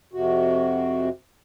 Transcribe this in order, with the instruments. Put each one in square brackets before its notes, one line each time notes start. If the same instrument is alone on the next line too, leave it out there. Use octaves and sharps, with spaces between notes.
[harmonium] F2 C3 F#4